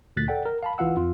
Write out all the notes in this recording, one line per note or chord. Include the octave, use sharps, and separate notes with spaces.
D2 A#2 F#6 A6 B6
A4 D5 F#5 G5
A#4
F5 A5 B5
C#2 E3 F4 F5 F#5 E6
F2 F4